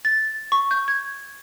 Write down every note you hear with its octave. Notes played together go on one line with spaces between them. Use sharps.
A6
C#6
G6
G#6